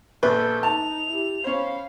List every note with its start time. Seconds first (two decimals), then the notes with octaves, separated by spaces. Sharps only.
0.23 A#1 A#3 A4 B4 G6
0.63 D#4 A5 F7
1.10 E4 G4
1.44 C#4 C5 F5 B5